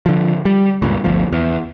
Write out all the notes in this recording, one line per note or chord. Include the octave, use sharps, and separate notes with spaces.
D3 F3
G3
C#2 G2 A#2
G1 D2 F3
E2